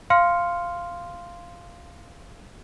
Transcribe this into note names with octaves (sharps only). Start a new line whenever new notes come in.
F5 C6 F6 C#7